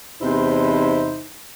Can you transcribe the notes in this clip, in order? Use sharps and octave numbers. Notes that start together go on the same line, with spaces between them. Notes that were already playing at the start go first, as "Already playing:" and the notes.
E2 C3 D#4 E4 C5